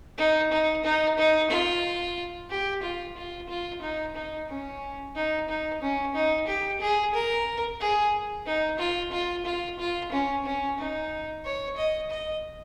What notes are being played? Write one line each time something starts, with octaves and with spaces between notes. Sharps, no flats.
D#4
D#4
D#4
D#4
F4
G4
F4
F4
F4
D#4
D#4
C#4
D#4
D#4
C#4
D#4
G4
G#4
A#4
G#4
D#4
F4
F4
F4
F4
C#4
C#4
D#4
C#5
D#5
D#5